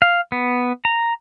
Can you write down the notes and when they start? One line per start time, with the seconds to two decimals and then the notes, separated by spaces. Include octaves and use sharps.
0.02 F5
0.32 B3
0.85 A#5